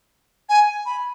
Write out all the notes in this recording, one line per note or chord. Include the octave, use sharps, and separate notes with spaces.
G#5
B5